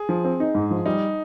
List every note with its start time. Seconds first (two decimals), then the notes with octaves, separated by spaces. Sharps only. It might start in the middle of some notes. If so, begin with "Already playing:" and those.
Already playing: G#4
0.09 F3
0.24 C4
0.40 D#4
0.55 G#2
0.71 F3
0.86 G3 D#4